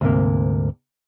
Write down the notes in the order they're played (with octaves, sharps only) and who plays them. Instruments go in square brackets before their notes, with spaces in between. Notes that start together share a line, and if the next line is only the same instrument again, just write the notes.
[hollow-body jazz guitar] D2 G#2 C3 A#3